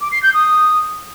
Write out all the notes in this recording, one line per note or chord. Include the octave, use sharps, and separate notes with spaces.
D6
C7
G6
D#6